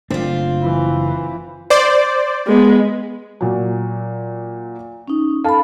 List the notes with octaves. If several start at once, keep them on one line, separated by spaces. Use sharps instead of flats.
F#1 A3 C4 D4 F4
E3
C5 D5
G#3 B3
A#2 F#3
C#4 D#4
A4 F5 A5 B5